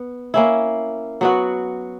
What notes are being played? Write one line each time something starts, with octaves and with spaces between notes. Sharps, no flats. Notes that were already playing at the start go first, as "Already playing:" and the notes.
Already playing: B3
A#3 C#4 E4
F#3 B3 F#4